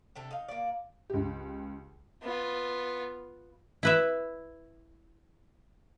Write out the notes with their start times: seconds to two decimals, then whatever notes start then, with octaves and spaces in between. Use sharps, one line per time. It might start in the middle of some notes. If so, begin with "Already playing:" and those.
0.16 C3 D4 A4
0.31 D#4 F5
0.48 A#3 D5
1.10 C#2 G4
2.23 B3 F4
3.83 E4 B4 E5